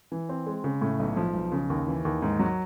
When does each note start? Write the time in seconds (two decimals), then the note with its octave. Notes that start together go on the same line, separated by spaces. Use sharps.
0.12 E3
0.29 C4
0.46 G#3
0.64 C#3
0.81 A2
0.99 B1
1.17 F3
1.34 B1
1.52 C#3
1.70 D#2
1.88 E3
2.05 D#2
2.22 G#2
2.39 F#3